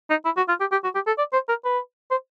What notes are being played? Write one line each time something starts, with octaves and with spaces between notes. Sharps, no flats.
D#4
E4
F#4
F4
G4
G4
F#4
G4
A4
D5
C5
A#4
B4
C5